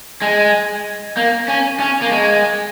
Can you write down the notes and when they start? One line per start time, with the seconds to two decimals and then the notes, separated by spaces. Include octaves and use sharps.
0.22 G#3
1.17 A#3
1.48 C#4
1.80 C#4
2.02 A#3
2.12 G#3